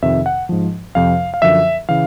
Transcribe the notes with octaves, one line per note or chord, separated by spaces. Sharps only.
F2 C3 D#3 E5
F#5
G#2 F3
F2 C3 F3 F5
F5
F#2 D3 F3 E5
C#3 E3 F5